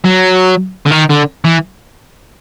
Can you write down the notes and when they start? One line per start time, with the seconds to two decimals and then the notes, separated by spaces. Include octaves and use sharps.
0.05 F#3
0.86 D3
0.92 D#3
1.10 D3
1.45 E3